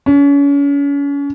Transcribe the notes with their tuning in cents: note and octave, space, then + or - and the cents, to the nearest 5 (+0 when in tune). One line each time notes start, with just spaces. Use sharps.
C#4 +35